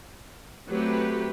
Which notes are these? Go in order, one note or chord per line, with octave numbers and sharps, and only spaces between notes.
F#3 A3 C4 G4 B4